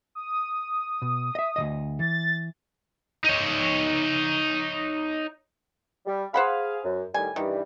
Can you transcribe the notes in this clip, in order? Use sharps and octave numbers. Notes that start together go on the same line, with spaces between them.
D#6
B2
D#5 E5
D2 C3 D#5
E3 A6
D#4 C#5
G3
G#4 C5 F5 F#5 B5
F#2
A2 D#3 G3 G#5
G2 D#3 E3 G3